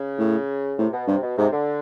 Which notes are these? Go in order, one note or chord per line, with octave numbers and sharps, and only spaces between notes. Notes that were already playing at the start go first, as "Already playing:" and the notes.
Already playing: C#3
A2
A2 C3
B2
G2 C3
B2
G#2 C3
D3